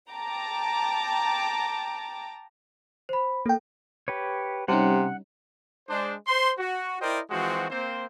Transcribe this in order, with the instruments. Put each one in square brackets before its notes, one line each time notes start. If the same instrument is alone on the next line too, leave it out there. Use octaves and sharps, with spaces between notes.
[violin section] G5 A5 A#5 D6
[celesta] C5 B5
[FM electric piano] A#3 G5 [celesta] A4
[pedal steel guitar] G4 B4 C#5
[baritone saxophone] C3 [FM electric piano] G3 C#4 D#4 [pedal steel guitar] F#5
[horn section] G#3 D4 C5
C5 C6
F#4
E4 A#4 C5 D5 D#5 G5
E3 F3 G#3 C4 F#4
A#3 C4 C5